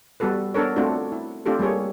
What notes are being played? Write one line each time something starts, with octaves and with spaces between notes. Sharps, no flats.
G3 B3 F#4 A4 B4
B3 D4 A4 A#4 C#5
A3 C4 D4 F4 F#4
E4
A3 C4 D4 F4 G4 A4
G3 A#3 G#4 C#5